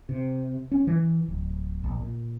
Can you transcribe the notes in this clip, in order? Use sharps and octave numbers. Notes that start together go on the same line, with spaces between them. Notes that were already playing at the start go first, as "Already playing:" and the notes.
C3
C#4
E3
D1
A#1
A#2